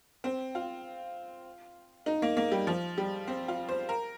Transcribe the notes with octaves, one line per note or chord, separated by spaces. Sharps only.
C4
F4
D#4
A#3
A#3
G3
F3
G3
C4
F4
C5
A#4